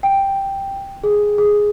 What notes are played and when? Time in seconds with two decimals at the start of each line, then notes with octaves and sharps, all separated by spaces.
0.03 G5
1.04 G#4
1.38 G#4